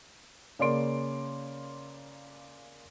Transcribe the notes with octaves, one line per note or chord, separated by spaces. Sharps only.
C#3 A#3 D5 C6 D7